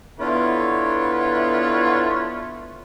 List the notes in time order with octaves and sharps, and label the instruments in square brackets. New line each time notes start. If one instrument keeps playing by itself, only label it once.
[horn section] D3 B3 E4 F4 B4 C#5